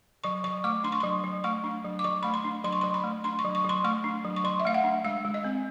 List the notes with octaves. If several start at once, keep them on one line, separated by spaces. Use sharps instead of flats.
F#3 C#6
F#3 C#6
A3 D6
D4 C6
C#6
F#3 C6
F#3
A3 C#6
D4
F#3
D6
F#3 C#6
A3 B5
C6
D4
F#3 C6
C#6
F#3 C6
B5
A3
D4 C6
C#6
F#3
C#6
F#3 C6
A3 C#6
D4
F#3
C#6
F#3 C6
E5
A3 F5
F#5
D4
G#3 F5
G#3
D#5
C4